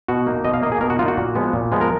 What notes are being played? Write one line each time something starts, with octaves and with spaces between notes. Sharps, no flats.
B2 F#4
A#3 D#4
B2 D#5
F5
A#3 D#4 D#5
G#4
B2 A#4
F#4
A#3 D#4 F4
F#4
A#2
F3 G#3 B3
A#2
F3 G#3 B3
A#4